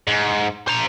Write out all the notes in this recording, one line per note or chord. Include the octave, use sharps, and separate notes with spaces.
G#2
C5 A#5